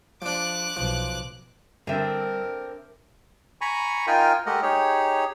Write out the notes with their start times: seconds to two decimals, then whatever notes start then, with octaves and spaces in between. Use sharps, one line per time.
0.22 F3 D4 D6 F#6
0.77 B1 F3
1.87 G2 D3 C4 A#4 E5 D#7
3.61 G#5 A#5 B5 C#6
4.07 D#4 F4 A#4 G5 G#5
4.46 G#3 A3 G4 A#4 D#5 F#5
4.62 D#4 G4 G#4 C#5